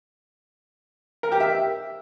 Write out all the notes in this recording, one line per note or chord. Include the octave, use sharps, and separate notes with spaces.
A#4
G4
E5